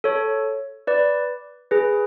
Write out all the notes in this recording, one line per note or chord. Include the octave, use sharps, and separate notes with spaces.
A4 C#5
B4 D5
G#4 B4